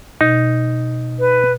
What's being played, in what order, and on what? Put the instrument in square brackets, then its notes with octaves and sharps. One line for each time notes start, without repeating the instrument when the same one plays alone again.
[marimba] B2 [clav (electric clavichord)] D#4
[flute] B4